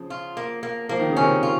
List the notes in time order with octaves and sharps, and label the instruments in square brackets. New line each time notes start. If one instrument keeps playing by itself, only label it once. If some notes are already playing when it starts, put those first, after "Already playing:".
Already playing: [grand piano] C#3 F3
[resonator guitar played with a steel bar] F4
A#3
A#3
[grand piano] F3 [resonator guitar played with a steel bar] A#3
[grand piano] D#3
C#3
[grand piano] C3 D#3 [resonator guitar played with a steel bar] C#4
[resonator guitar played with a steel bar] F4